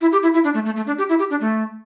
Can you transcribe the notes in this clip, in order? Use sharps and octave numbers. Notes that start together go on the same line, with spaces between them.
E4
G4
E4
E4
D4
A3
A3
A3
D4
G4
E4
G4
D4
A3